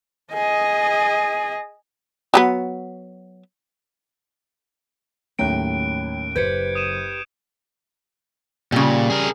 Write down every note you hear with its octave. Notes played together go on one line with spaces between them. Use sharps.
G#4 D#5
F#3 G3 B3
D#2 A2 F#3 C#4 G5 F#6 D7
F#1 G4 B4 C5 G6 G#6 C#7
D#6 D#7 E7
A#2 C#3 G3
G#4 A#4